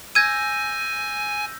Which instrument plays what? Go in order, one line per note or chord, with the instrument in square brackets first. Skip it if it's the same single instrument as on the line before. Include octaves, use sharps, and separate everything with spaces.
[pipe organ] G#5 [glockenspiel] E6 G6 A#6 [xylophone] G#6 D#7